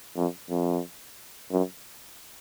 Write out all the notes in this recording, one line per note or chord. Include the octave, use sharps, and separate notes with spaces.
F2
F2
F#2